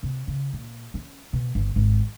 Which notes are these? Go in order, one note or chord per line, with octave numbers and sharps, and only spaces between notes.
C3
C#3
A#2
C#4
B2
G1
G#1